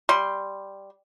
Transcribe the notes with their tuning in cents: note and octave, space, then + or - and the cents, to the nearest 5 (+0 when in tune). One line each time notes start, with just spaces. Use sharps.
G3 +0 C6 +0